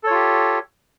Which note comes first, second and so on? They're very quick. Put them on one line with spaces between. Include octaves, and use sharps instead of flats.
A4 C#5 F4 G4